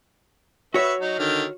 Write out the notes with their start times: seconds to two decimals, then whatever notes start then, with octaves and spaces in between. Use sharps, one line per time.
0.74 F#4 B4 C#5 E5 C#6
1.01 F#3 D#4
1.19 D3 D#3 F6